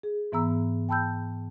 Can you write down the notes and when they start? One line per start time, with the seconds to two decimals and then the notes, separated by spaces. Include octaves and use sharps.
0.03 G#4
0.32 G#2 E3 B3 A#5 E6
0.89 G5 A5 B5 E6 G6